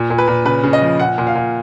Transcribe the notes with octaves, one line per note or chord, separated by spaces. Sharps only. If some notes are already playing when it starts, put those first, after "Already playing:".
Already playing: A#2
A#2
B4
A#2
C#3 B4
C#3
D#5
F3
A#2 F#5
A#2
F5
A#2